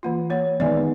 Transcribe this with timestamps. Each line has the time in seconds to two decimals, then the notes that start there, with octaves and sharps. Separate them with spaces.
0.03 E3 A#3 F4
0.30 A#3 C#5
0.60 D#3 G#3 B3 D5 E5 G#5